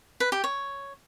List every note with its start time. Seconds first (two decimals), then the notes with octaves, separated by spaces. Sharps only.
0.20 B4
0.32 G4
0.44 C#5